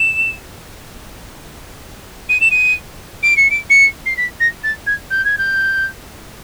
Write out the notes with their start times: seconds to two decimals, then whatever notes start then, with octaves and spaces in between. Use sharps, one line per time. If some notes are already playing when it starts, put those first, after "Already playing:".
Already playing: E7
2.29 D#7
2.41 E7
2.51 D#7
3.23 D7
3.37 C#7
3.50 D7
3.70 C#7
4.06 C7
4.17 B6
4.40 A#6
4.63 A6
4.86 G#6
5.10 G6
5.24 G#6
5.38 G6